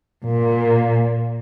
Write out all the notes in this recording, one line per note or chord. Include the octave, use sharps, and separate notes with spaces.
A#2